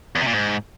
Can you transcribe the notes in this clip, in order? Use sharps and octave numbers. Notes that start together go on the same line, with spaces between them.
E2
C3
A#2
G#2